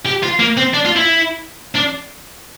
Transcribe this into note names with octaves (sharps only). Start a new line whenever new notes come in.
G4
F4
A#3
C4
D4
F4
E4
D4